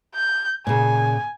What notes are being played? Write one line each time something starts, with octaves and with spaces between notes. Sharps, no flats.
G6
A#2 C#3 G#5